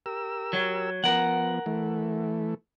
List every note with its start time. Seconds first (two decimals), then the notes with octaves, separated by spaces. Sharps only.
0.06 G4 A#4 E6
0.53 F#3
1.04 F3 B3 A#4 F#5
1.66 E3 A3